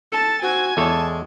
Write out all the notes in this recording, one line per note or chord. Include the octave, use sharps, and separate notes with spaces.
A4 A5 A6
C4 F#4 G#5 G#6
E2 G#3 A4 C#5 A5